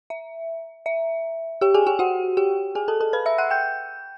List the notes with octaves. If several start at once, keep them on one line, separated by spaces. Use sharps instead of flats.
E5
E5
G4 G5
G#4 G#5
G4 G5
F#4 F#5
G4 G5
G#4 G#5
A4 A5
A4 A5
B4 B5
E5 E6
F#5 F#6
G5 G6